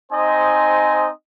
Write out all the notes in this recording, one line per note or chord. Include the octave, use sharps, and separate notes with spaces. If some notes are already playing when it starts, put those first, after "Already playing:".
C4 D#4 C5 D#5 G#5